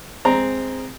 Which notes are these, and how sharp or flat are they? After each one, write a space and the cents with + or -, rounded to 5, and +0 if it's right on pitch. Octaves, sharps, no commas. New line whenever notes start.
G#3 -10 C4 -5 A#5 +0